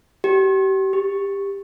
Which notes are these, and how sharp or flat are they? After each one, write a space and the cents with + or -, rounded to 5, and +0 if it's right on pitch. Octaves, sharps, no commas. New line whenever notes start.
G4 -35
G4 +20